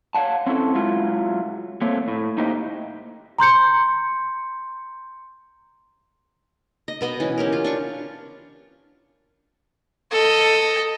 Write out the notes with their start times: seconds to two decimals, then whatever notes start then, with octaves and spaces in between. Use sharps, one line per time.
0.15 C#5 D5 F5 F#5 A5
0.47 C4 C#4 E4 A4
0.75 F#3 G#3 E4 F4
1.81 A3 A#3 C4 C#5
2.08 A2
2.38 A#3 D#4 E4 G4 C5 D#5
3.38 A#5 C6 G6 C#7
6.88 D#5
7.01 B2 B3 D#5
7.20 E3 C#4
7.38 C#4 G4 A#4
7.53 F4
7.64 D4 F4 C#6
10.12 A4 D#5